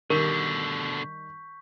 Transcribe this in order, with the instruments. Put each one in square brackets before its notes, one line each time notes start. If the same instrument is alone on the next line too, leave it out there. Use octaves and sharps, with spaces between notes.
[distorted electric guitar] B2 D3 [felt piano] D#3 G3 [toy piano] A#4 [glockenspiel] C#6 G6 B6